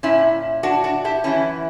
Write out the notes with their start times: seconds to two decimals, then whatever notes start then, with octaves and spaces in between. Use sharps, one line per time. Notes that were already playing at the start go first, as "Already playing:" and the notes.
0.03 A#2 C#4 E4
0.63 D4 F#4
0.84 D4 F#4
1.05 E4 G4
1.24 F#2 E3 C#4 E4